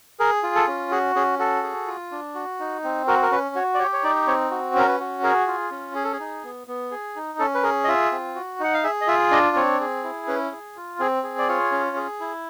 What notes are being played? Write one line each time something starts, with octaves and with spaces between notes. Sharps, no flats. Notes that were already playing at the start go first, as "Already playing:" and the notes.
G#4 A#4
F4
A4
C#4
F#4 G#4
C#4 G#4
F#4 A4
G#4
F4
D4
F#4
D#4
C4
F#4 A#4
A#4
C#4 B4
F#4 C#5
D5
G4 C#5
C#5
D#4 D5
C4 C#5
F#4
C#4 A#4
B4
F#4
G#4 A#4
F4
C#4
G#4
A4
G#4
D#4
B3
B3
G#4
D#4
C#4 A4
B4
G#4 A#4
D#5
F4 E5
C4
F#4
D#4 F#5
F5
G#4 E5
D#5
F4 E5
D4 D#5
C4 C#5
G#4
E4
C#4 B4
G#4
F4
C4 G#4
G#4
D5
F4 C#5
C#4
G#4
E4